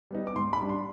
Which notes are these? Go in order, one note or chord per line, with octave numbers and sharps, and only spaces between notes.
G3 B3 D#4
D6
G#2 C6
B5
G3 D4
C6